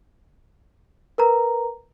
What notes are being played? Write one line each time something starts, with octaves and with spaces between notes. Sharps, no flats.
A#4 B4 A#5